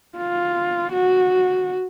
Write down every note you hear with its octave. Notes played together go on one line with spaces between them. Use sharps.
F4
F#4